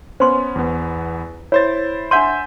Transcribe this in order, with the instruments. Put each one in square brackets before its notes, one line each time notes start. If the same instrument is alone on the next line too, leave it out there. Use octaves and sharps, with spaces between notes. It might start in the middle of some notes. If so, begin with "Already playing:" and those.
[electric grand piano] B3 C#4 [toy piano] C5 C6
[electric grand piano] E2 B3
[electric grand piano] E4 C5 A6 [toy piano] C#5
[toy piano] D4 F#5 C6 [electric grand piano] E5 G6 D#7